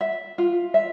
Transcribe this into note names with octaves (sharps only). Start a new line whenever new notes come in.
E5
F4
E5